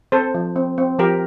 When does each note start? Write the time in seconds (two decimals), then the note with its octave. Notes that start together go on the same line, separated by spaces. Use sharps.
0.12 C4 A4 C5
0.34 F3
0.56 C4
0.78 C4
0.99 F3 G4 A#4